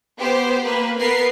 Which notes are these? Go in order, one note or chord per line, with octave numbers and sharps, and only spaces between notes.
B3 G4 C5
A#3 B4
B3 A#4 B4 C7